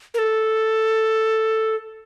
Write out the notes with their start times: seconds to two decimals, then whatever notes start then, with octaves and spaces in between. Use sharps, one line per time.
0.14 A#4
0.18 A4